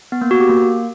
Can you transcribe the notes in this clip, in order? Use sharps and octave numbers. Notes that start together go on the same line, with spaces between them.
B3
A#3
F#4
G4
A#3